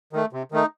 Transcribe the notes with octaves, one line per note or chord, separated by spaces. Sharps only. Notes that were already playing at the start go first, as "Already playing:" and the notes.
D#3 A3
C3
D#3 A3 D#4